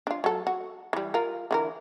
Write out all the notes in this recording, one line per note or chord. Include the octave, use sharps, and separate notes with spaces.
D4 F4
F#3 A4
F#4
E3 G3
F4 A#4
D3 E3 A#4